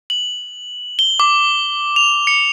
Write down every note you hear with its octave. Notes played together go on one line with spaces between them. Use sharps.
F#7
G7
D6
F7
C#7